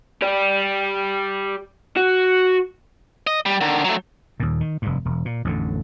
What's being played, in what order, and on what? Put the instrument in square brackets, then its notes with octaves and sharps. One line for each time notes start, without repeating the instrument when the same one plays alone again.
[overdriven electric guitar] G4 D5
F#4
[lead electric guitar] D#5
G3
D3 D#3
F#3 A3
[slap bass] D#2 A#2
D#3
F1 G2
E1
A#2
A1 F2 A#2 D3